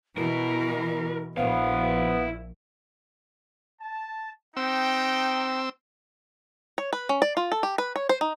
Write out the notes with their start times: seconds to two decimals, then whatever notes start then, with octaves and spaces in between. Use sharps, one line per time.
0.18 B2 E3 E4 A#4
1.37 A#1 B3 E4 C5 F5
3.81 A5
4.57 C4 D#4 G5 E6
6.78 C#5
6.93 B4
7.09 C#4
7.22 D5
7.37 F4
7.52 A4
7.63 G4
7.78 B4
7.96 C#5
8.09 C5
8.21 D#4